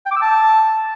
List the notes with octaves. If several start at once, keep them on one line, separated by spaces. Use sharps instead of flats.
G5
D6
E6
A5